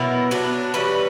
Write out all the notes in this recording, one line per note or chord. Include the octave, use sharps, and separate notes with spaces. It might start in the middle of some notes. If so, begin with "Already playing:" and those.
Already playing: B2 F#3 B3 E4 A#4
F#3 B3 D4
E3 G3 C#4 B4